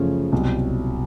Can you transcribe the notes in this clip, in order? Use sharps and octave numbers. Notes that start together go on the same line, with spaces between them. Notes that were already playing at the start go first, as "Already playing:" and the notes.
Already playing: F#2 C#3 F3 A3 C#4
C2 B2 F#3